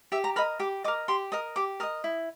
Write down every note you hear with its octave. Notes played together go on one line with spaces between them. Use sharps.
G4 E5
A#5
A#4 D#5 B5
G4 D6
A#4 D#5 D6
G4 C6
A#4 D#5 D#6
G4 D6
A#4 D#5 D#6
E4